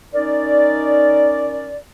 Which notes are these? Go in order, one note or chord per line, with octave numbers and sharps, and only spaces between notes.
C#4 D#4 A#4 D5